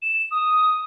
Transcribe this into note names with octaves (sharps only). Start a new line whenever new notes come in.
E7
D#6